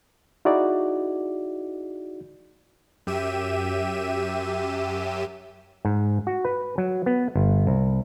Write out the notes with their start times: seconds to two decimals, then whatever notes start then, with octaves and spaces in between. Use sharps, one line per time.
0.45 D#4 E4 F#4 G#4 D5
3.07 F#2 G4 E5 D#7 E7
5.85 G#2
6.27 F#4
6.45 B4
6.78 F#3
7.06 B3
7.35 G1
7.67 C2